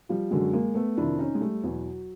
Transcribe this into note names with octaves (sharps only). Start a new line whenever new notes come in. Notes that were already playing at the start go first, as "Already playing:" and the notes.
F3 G3
F#2 D3 F#3 G#3
G#3 A#3
A3 B3
F2 C3 D#3 D4 E4
C#4 D#4
G#3
G3 A3
E2 B2 F#3